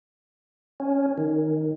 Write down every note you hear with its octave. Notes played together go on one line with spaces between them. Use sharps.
C#4
D#3